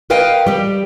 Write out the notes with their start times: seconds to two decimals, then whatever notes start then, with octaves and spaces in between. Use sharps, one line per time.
0.10 A#4 B4 D#5 F5 G5
0.47 G3 G4